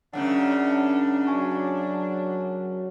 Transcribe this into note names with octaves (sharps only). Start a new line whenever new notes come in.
F#2 C#3 C#4 D4 D5 F#5
F#3 G#5 A5 C#6